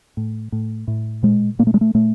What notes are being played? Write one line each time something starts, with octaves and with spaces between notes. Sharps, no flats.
A2
A2
A2
A#2 G#3
A#2 A#3
A3
G#3
A3
A#2 A3